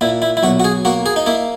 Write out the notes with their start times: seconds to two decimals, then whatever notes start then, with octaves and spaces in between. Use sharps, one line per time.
0.01 A#2 E4
0.22 E4
0.37 E4
0.43 B1 F#4
0.60 F#4
0.64 G#4
0.85 A#3 F#4
1.06 G#4
1.16 D#4
1.26 A#3 E4